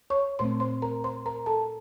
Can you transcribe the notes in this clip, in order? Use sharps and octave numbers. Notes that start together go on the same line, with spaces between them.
C#5 C#6
A#2 A3 C4 C5 C6
C5 C6
A#4 A#5
C5 C6
A#4 A#5
A4 A5